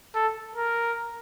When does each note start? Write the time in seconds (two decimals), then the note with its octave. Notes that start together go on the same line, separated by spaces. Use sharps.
0.15 A4
0.56 A#4